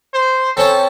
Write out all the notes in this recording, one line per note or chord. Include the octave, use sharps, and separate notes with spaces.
C5
C4 C#4 A4 A5